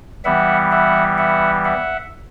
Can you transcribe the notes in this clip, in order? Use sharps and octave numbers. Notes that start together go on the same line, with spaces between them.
E3 G3 B3 E5 F#5
E5 F#5
E5 F#5
E5 F#5